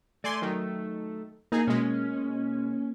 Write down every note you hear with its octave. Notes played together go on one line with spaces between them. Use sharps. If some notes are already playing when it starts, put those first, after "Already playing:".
A3 D5 G#5 C6
D#3 F#3
A#3 D#4 G#4
B2 G#3 C#4